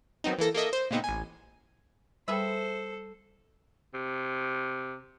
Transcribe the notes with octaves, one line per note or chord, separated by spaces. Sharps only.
D#3 F#3 B3 C4 D#4
E3 A#3 A4 A#6
A#3 A4 D#5 E5
C5
A#2 C#3 G#3 B3 C4 D#4
A1 G#5
G3 G#4 A4 B4 C5 E5 G5
C3